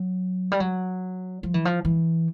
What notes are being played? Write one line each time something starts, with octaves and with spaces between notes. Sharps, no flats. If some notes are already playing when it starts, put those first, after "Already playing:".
Already playing: F#3
G3
F#3
F3
E3
F3
E3